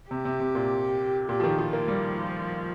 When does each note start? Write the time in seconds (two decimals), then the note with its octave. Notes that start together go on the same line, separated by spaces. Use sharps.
0.11 C3 G4
0.25 C3
0.40 C3
0.55 A#2
1.29 A#2 G4
1.40 F3
1.44 D#3
1.58 F3 F4
1.73 A#3
1.88 F3 G3